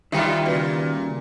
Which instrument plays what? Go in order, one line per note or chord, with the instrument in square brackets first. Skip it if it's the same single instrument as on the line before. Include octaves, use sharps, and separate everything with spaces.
[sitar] C3 E3 D#4 [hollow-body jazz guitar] D#3 G3 F4 [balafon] E5 G5
[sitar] A#2 [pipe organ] C#3 A#3 C#4 [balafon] F#4 B4 D5